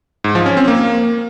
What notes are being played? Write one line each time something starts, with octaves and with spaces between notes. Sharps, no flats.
G#2
F3
C#4
C4
A#3